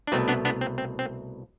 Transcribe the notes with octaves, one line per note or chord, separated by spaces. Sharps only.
D4
C2 B2 A3 C4
B3 D4
B3 D4
C4
C4
C4